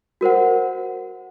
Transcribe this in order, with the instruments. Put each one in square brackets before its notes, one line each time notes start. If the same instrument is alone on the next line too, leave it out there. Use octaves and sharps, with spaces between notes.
[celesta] F#4 A#4 C5 F#5